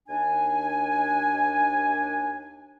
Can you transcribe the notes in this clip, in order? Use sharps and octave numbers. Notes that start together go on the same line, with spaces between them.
D#2 D4 G#5